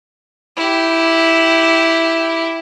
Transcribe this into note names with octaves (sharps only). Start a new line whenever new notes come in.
E4 G4